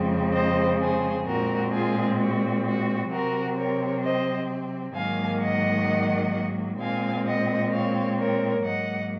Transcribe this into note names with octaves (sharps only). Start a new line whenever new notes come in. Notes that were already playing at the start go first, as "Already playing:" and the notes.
Already playing: F2 C#3 G#3 C4
C5 D#5
G#4 C5
A#2 G#3 C4 F#4 A#4
F4 G#4
F#4
F#4
C3 F#3 C4 F#4 A#4
A#4 C#5
C5 D#5
G#2 D#3 F#3 A#3 F5 G#5
D#5 F#5
A#2 G#3 C4 F5 G#5
D#5 F#5
C#5 F5
A#4 C#5
G#2 F#3 A#3 D#5 F#5